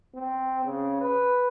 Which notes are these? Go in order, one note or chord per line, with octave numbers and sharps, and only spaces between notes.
C4
C#3
B4